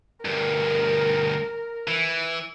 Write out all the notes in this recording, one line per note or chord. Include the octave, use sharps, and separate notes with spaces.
D2 G2 A#4
E3